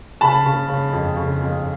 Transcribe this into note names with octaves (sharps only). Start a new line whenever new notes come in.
C#3 A5 B5
C#3
C#3
F2
C#3
F2